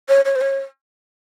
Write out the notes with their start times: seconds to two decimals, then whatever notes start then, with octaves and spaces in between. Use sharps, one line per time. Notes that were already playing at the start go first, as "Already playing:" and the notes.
0.09 C#5
0.25 C#5
0.36 C5
0.41 C#5